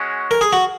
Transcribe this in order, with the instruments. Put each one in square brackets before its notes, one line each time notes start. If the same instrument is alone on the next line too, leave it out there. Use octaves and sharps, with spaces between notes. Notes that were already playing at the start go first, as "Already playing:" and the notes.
Already playing: [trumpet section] G#3 C#4 F#4
[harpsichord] A#4
G#4
F#4